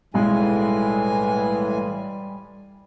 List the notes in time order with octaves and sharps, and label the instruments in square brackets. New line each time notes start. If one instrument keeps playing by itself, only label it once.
[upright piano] B1 G#3 [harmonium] A2 E3 G#5 [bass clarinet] G3